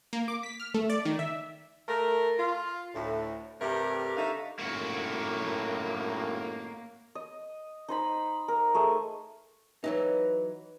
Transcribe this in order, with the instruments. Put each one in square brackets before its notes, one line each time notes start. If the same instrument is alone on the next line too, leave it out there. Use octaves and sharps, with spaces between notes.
[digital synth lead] A#3
D6
B6
F6
A3
D5
D#3
E5
[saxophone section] A3 A#4
F4
D2 A2
G2 C3 A3 G4 A#4
D3 D#4 C#5 E5 F5
[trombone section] G#1 F#2 A2 [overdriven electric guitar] A#3 F#4
[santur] D#5
D#4 C5 B5
A#4
A3 G#4 D#5
[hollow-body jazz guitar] E3 F#3 D#4 [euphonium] B4